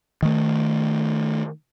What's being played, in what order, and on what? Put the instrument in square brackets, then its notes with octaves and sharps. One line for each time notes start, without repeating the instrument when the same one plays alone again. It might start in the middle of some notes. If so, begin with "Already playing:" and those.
[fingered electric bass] D#3 A3